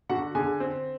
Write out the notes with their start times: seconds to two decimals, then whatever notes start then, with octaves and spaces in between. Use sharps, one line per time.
0.09 D3 F#4 F#5
0.35 D3 G#4 G#5
0.60 C4